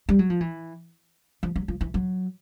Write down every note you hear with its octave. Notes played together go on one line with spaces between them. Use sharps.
G3
F#3
F3
E3
F3
F#3
F3
E3
F#3